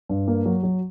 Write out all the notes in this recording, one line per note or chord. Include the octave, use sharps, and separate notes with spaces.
G2
A#3
F#3
F#3